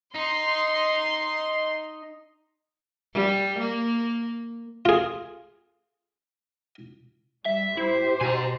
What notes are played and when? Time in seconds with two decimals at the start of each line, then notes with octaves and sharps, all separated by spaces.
0.16 D#4 C6
3.14 G3
3.59 A#3
4.85 F4 G#4
7.45 G3 E5
7.77 E4 G4 C5
8.21 B2 G#5 A#5